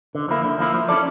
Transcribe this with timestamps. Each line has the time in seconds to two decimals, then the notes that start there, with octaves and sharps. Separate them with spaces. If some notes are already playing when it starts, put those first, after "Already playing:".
0.15 D3
0.28 F3 A#3 E4
0.45 D3
0.59 F3 A#3 E4
0.74 F3
0.88 C#4 E4 A4 D5